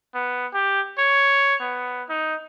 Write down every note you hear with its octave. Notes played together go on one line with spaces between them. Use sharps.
B3
G4
C#5
B3
D#4